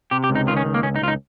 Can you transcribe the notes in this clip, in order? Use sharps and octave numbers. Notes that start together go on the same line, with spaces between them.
C3 G4
G4
C#2
D#4
D#3 F4
C#4
C#2
A#3
C#2 C#4
D#4
C#2 F4
D#4